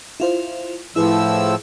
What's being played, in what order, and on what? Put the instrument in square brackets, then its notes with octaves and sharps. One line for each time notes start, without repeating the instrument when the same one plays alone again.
[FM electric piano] E4 F4 C5
[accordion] A2 F3 E6 [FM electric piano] E4 G#4 B4